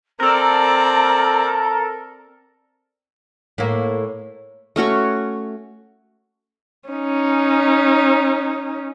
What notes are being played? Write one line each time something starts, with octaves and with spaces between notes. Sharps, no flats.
C4 A4 A#4 D5 A#5
A2 A#3
A3 C#4 F#4 C#6
C#4 D#4